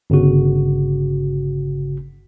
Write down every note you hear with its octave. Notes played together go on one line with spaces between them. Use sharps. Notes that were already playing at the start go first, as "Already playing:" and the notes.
G1 C#3 F#4